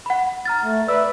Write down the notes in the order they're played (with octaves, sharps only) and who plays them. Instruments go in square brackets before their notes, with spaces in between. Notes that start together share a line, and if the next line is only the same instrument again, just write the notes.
[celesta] F#5 B5
A#5 F6 A6
[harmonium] A3
[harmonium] B4 D5 E5 [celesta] E6